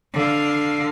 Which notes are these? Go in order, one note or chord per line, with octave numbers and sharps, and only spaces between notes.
D3 F5